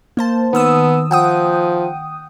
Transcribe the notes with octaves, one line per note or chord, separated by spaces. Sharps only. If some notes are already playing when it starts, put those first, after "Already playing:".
A#3 C5 A5
D#3 B3 D#6 E6
F3 F#5 G5 D#6